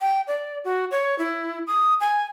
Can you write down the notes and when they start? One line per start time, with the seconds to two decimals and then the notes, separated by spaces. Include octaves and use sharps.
0.01 G5
0.27 D5
0.65 F#4
0.91 C#5
1.19 E4
1.67 D#6
2.00 G#5